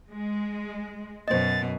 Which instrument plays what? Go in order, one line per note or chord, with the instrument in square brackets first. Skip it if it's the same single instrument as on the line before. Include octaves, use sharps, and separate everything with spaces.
[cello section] G#3
[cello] F#2 B2 [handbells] C5 D#5 [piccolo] A6